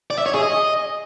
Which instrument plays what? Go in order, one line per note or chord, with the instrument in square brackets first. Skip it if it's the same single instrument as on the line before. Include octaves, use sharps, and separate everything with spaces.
[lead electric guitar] D5
E5
C#5
G#4
D#5